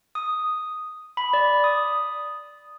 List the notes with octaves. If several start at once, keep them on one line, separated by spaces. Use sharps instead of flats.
D#6
B5
D5
D#6